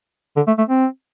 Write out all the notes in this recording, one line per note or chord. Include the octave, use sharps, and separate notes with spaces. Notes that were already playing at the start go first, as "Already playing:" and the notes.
D3
A3
A3
C4